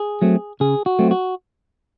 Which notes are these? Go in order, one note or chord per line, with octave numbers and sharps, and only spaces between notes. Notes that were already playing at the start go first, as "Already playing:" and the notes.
Already playing: G#4
F#3 A3 C4
C#3 G#4
F#4
F#3 A3 C4
F#4